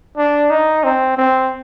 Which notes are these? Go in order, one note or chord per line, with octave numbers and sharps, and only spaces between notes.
D4
D#4
C4
C4